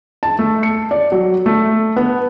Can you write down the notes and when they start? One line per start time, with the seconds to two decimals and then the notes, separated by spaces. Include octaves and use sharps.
0.23 A5
0.39 A3
0.63 C#7
0.91 D5
1.12 F#3
1.46 A3
1.96 B3